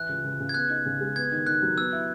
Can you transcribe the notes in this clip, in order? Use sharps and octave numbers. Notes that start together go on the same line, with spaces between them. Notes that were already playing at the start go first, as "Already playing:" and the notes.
Already playing: E3 F#6
C#2
C#2
C#3
G#6
B3 F#6
D#4
C#3
G#3
B3 G#6
D#3
D#3 F#6
F#3
B3 E6
E4